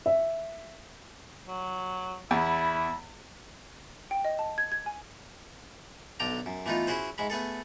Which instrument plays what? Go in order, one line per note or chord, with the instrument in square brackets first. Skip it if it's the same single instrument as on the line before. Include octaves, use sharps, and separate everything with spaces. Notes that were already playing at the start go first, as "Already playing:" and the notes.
[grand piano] E5
[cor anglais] F#3
[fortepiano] E2 [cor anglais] E4 [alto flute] B5
[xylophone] G5
D#5
A5
G#6
G#6
G#5
[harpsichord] B1 D3 D4 G5 A#5
F#2
E3 A3 B3 D#4 F4
C#4 E4 F#4 G#4 C5
G#2 G#3 E5 B5
A3 B3 G#4 A4